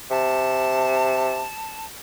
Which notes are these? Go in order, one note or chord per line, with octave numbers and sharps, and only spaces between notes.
C3 A5